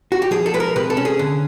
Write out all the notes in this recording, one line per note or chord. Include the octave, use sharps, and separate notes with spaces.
F#4
G4
F3 G#4
A4
G#3 B4
A#4
C3 B4
A4
C#4
G#4
D3